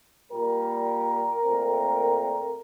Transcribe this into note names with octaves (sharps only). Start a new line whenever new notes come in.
A#2 G3 A#3 A#4
A#2 A3 C4